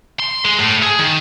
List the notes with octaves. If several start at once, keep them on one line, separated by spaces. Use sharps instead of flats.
C6
G#3
A2
G#4
D#3